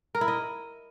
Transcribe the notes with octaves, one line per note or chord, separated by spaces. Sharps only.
A#4
E4
D#5